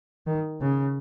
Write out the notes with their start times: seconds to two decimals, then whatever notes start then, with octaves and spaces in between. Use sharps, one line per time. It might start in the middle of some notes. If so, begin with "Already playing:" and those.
0.27 D#3
0.61 C#3